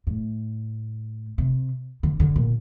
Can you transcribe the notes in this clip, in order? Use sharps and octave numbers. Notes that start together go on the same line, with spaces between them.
A2
C3
D3
D3
A#2